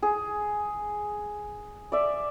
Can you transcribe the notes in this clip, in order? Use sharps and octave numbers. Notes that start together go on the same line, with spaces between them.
G#4
D5 E5